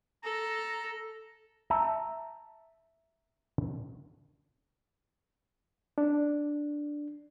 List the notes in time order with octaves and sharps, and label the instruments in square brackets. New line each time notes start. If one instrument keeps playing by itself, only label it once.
[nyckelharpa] A4 [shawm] A#5
[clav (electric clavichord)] E5 A5 A#5
[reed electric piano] D4